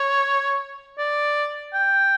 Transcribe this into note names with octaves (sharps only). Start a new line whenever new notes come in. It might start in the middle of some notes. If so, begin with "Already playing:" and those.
Already playing: C#5
D5
G5